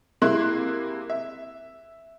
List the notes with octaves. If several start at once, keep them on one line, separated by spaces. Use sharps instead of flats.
C3 G#3 A#3 E4 C6 F#6
E5